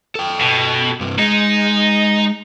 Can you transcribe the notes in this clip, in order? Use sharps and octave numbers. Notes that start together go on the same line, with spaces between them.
A4 G5
B2
G2 C3
G#3 D#4